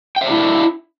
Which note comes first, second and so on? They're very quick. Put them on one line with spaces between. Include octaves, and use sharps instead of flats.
G5 E5 D4 E4